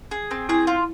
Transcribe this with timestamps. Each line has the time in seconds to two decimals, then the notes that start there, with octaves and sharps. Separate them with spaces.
0.11 G#4
0.31 C4
0.49 E4 G#4
0.67 F4